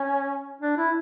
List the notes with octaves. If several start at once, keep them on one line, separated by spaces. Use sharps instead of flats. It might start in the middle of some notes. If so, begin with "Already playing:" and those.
Already playing: C#4
D4
E4